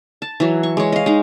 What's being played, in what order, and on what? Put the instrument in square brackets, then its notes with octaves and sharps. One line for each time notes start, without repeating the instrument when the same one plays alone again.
[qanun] A5
E3 F#3
C#6
G#3 C#5
D#5 F5
G#3 D#4